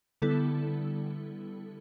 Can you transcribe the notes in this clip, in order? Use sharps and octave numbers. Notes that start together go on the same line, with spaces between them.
D3 G3 B3 E4 A4